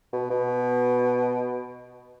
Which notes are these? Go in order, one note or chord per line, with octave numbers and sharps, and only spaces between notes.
B2
B2